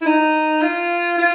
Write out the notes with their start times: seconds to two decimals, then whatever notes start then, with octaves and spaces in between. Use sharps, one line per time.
0.02 E4
0.06 D#4
0.62 F4
1.18 F4